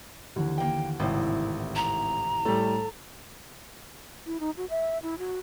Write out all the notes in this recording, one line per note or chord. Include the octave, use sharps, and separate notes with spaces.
D#2 D3 E3
A#3 G5
G#1 A2 C3 E4
A#5
A2 G3 A3 A4
E4
D#4
F#4
E5
E4
F#4